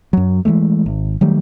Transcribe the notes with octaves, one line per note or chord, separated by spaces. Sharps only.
F#2 F#3
E3 F3 G#3 A3
G#1
D#3 F#3 G3 A3